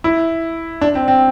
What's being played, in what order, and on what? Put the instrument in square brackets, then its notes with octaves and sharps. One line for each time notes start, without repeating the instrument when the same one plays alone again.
[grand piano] E4
D4
C4
C4